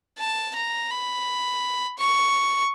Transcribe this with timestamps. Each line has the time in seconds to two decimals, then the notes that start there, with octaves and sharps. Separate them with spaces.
0.19 A5
0.56 A#5
0.91 B5
1.98 C#6